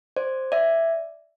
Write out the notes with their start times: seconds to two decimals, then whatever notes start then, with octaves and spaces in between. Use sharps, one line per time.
0.17 C5 D5
0.52 D5 E5